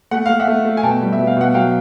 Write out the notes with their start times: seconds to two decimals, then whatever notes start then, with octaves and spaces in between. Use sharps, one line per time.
0.11 A3 F#5
0.26 A3 F5
0.40 E5 F#5
0.48 A3
0.65 A3
0.77 G#5
0.83 B2 G5 A5
1.01 G3
1.13 E5
1.19 B2
1.27 F5
1.37 B2 F#5
1.54 F#3 F5 G5